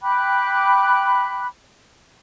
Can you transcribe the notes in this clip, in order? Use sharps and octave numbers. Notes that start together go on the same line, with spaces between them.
G5 B5 D6 F#6